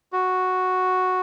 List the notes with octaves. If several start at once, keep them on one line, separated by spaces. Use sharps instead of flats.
F#4